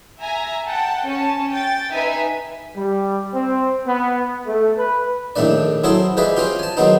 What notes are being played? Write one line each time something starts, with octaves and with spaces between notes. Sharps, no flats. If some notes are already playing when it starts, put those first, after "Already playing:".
E5 G#5 A#5
F#5 G5 A5
C#4 A5
G5 A6
D#4 B4 E5 G#5
G3
C4
B3
A3
B4
A#1 A2 D#3 A3 D4 D5
F#3 C4 E4 G#4 A4
F3 G#3 G#4 B4 D5 E5
C4 C#4 F4 G4
G#5 A5
D#3 F#3 G#3 B3 C4 D#4